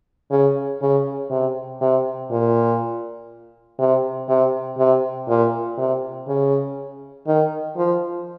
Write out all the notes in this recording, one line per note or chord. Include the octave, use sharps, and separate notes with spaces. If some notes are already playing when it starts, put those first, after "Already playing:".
C#3
C#3
C3
C3
A#2
C3
C3
C3
A#2
C3
C#3
D#3
F3